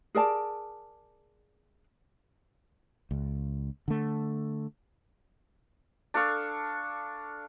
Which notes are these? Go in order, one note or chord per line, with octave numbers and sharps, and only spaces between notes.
G#4 A#4 D5 A5
C#2
D3 A3
D4 A4 F5 C#6